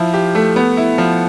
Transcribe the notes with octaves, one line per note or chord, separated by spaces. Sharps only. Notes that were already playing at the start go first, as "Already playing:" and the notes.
Already playing: F3 E4
G4
A3
B3
E4
F3